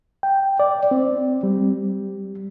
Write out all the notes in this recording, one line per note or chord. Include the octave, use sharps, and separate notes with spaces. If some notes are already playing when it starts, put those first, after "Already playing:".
G5
D5
C4
G3